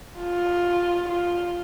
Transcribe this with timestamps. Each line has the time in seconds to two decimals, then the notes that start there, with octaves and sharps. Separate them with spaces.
0.19 F4
1.09 F4